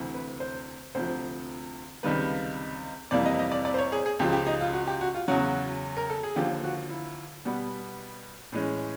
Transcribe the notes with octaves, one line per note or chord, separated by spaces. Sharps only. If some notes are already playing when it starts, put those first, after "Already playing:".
Already playing: D2 C3 E3
B4
C5
D2 C3 F3 C5
C#2 C3 D#3 G3 A#3 B4
F2 C3 E3 G3 A#3 D5
D#5
D#5
D5
D5
C5
C#5
G#4
G#4
C#2 C#3 F3 G4
G4
D#4
F4
F#4
G4
F#4
F4
E2 C#3 F#3 F#4
A#4
A4
G#4
D#2 D3 F3 A#3 G4
F#4
E4
B2 G3 B3
A2 E3 G#3 C#4